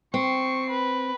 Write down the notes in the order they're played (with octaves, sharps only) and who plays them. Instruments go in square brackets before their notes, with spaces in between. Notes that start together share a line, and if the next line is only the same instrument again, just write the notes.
[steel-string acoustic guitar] C4 [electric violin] C#6 C7
[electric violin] B4